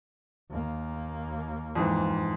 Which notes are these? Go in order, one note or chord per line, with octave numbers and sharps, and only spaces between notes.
D#2 A#3
F2 G#2 E3